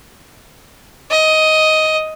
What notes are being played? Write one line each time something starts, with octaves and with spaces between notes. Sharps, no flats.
D#5